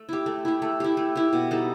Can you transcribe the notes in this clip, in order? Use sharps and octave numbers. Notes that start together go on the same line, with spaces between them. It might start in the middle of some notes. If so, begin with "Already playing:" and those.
Already playing: A3
E4 G4
A3
E4 G4
A3
E4 G4
A3
E4 G4
B2
G3 D#4 A4